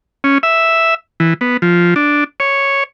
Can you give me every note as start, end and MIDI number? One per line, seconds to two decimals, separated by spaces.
0.24 0.38 61
0.43 0.94 76
1.20 1.34 52
1.41 1.57 59
1.62 1.94 53
1.96 2.24 62
2.40 2.84 73